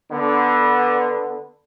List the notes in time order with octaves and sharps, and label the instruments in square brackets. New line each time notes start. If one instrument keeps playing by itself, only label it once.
[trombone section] D3 B3